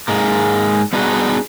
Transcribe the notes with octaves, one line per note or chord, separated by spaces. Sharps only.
G#2 G#3 A#3
G3 B3 D4 D#4 F#4 G#4